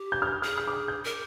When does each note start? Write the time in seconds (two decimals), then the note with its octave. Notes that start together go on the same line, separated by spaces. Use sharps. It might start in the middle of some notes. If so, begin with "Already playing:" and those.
Already playing: G4
0.12 G6
0.22 F6
0.27 G6
0.42 G#4 F6
0.58 F6
0.67 D6
0.73 D#6
0.88 G6
1.04 A#4